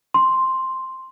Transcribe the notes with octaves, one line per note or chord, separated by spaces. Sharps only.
C6